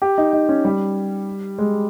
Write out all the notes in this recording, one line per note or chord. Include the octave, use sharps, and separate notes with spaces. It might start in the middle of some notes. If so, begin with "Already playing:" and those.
G4
D#4
D#4
C#4
G3
G#3